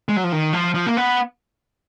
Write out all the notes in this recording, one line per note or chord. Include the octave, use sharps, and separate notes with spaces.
G#3
F#3
F3
D#3
F3
F3
A#3
B3